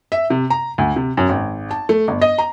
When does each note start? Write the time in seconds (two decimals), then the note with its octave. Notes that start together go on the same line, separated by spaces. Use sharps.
0.12 E5
0.30 C3
0.50 A#5
0.78 D2
0.96 C3
1.17 F#2
1.29 G#1
1.71 A5
1.89 A3
2.08 G1
2.21 D#5
2.38 A#5